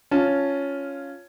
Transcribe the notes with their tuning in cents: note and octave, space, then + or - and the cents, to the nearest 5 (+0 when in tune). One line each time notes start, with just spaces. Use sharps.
C#4 +5 F4 +0 A5 +5